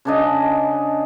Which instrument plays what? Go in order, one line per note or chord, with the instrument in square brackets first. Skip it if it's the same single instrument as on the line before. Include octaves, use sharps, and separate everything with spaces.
[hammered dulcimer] C#3 D4 D#5